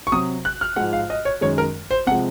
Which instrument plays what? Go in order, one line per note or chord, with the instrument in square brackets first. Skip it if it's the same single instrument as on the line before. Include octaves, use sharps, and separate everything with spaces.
[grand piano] C#6
C3 F#3 D#6
F#6
F6
G#2 F3 G#3 F#5
F5
D#5
C#5
F#2 D#3 G#3 C#5
A#4
C5
C3 F3 G#3 F#5